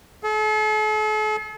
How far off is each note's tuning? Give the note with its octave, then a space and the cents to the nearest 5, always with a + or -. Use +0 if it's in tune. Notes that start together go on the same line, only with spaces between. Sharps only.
A4 -45